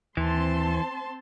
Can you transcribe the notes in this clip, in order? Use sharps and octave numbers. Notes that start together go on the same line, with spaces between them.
D#2 E3 C4 A5 C6